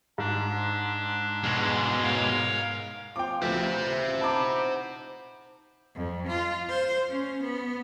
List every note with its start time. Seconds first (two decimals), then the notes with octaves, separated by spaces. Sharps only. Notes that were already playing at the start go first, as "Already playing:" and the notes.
0.18 G#2 D4
1.44 B2 G#3
2.04 A#4 C#5 F5
3.16 F3 G5 D6
3.42 D2 E3 F3 C5 E5
4.21 D#4 F#5 A5 B5 D6
5.95 F2
6.27 F4
6.69 C5
7.09 C#4
7.42 B3